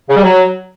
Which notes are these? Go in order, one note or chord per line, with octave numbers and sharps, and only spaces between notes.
C#3
G3
F#3